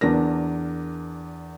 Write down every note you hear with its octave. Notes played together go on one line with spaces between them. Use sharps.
E2 D4 A#4 A#6